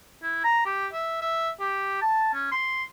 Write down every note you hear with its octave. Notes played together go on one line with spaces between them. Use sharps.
E4
A#5
G4
E5
E5
G4
A5
C#4
C6